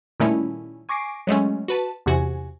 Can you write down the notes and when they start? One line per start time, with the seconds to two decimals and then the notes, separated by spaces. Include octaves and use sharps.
0.20 A#2 D#3 G3 A3 C#4 E4
0.89 G#5 C#6 D6 A#6 C7 D7
1.27 F#3 G#3 A3 C#4
1.68 F#4 B4 A5
2.06 E2 C3 F#4 G#5